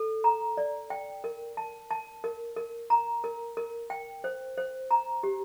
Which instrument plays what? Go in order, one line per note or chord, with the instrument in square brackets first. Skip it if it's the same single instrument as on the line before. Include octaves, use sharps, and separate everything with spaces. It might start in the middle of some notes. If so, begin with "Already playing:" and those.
Already playing: [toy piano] A4
A#5
D5
G5
A#4
A5
A5
A#4
A#4
A#5
A#4
A#4
G5
C5
C5
A#5
G4